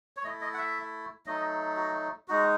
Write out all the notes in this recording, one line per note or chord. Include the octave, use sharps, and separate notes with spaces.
C#5
A3 E4 D#5
D#5
F#5
E5
F#3 A3 D#4 D#5
F#4
G#3 D#4 F#4